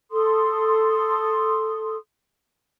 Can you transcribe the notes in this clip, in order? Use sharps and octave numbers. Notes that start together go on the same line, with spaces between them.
A4 C6 D#6